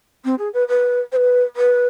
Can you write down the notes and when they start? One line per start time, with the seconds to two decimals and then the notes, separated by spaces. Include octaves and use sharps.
0.25 C4
0.39 G#4
0.54 B4
0.68 B4
1.12 C5
1.16 B4
1.56 B4